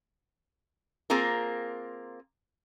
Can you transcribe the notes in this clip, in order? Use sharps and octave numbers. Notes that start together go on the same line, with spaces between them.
A#3 C4 F4 G#4 A#4